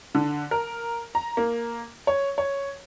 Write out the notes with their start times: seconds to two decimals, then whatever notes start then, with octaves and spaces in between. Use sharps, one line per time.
0.15 D3
0.51 A#4
1.15 A#5
1.37 A#3
2.07 C#5
2.38 C#5